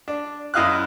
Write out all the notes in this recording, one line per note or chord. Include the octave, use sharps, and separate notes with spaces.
D4
F#2 E4 D#5 F5 F6 F#6